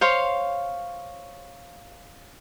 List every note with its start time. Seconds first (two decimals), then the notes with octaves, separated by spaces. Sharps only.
0.01 C5 C#5 F5 C6